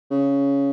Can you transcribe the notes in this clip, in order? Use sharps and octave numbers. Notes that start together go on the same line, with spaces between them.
C#3